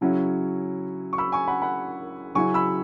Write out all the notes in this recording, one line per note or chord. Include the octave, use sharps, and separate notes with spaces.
C#3 F#3 C#4 E4
C#6
B5 E6
G#5 C#6
F#5 B5
F#5 B5
C#3 F#3 C#4 E4 G#5 C#6
B5 E6